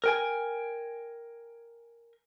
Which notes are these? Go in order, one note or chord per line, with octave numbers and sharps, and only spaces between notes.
A#4 G5 G#5